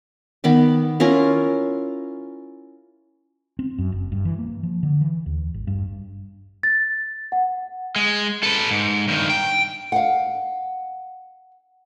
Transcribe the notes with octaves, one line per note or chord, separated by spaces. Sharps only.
D#3 B3 B5 D6
C#4 E4 F4 A#4
C4
F#2
F#1
G2
E3
A#3
F3
D3
E3
D#2
G#1
G2
A6
F#5
G#3
A4 B4
G#2
G2 D#3
G5
F5 F#5